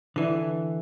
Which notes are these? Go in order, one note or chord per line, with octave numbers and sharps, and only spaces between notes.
D3 E3